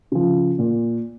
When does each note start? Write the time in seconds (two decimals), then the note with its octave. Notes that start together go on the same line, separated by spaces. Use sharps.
0.12 C#3 F3
0.59 A#2